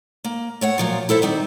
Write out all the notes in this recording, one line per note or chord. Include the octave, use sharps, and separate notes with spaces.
A#3
A3 C#5 F#5
A#2 F3 F#3
E4 A4 C5 E5
D#3 G3 C4